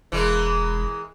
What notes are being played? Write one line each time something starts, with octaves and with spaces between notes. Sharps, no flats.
E1 E3 G#3 A#3